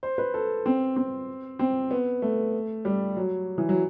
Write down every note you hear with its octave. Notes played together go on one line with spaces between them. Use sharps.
C5
B4
A4
C4
C4
C4
B3
A3
G3
F#3
E3
F#3